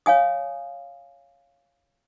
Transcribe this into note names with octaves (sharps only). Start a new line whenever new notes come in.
C#5 F5 G#5 D#6